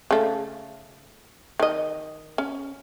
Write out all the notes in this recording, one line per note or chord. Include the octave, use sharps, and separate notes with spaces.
C#3 A3
D#3 D#5
C#4